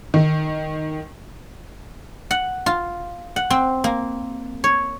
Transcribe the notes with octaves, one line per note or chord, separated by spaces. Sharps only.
D#3
F#5
F4
F#5
C4
A#3
C#5